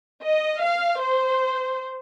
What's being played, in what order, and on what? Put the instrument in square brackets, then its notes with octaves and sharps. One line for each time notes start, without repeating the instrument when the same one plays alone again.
[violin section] D#5
F5
C5